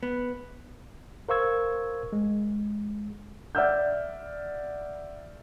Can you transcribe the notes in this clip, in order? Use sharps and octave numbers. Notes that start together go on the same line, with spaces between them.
B3
A#4 C5 F5 C#6 E6 G#6
G#3
D5 E5 F#5 E6 F6 G6